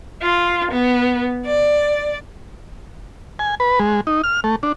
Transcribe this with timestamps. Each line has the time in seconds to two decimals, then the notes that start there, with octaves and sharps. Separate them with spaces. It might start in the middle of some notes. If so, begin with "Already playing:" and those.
0.22 F4
0.72 B3
1.46 D5
3.39 G#5
3.60 B4
3.80 G#3
4.07 D#4
4.24 F6
4.44 A3
4.63 D4